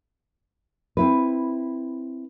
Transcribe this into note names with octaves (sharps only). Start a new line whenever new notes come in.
C4 E4 B4